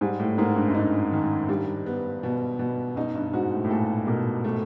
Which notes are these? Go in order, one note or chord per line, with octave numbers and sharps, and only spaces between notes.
G#2 G3
A2
G#2 A#3
G2
F#2
G2 D#4
D#3
G2 G3
B3
B2
B2
F#2 D#4
G2
G#2 F#4
A2
A2
A#2 A4
B2 A#3
A3